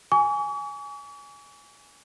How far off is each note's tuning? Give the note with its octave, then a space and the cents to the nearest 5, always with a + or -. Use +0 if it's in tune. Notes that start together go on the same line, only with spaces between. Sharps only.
G#5 +0 C#6 +45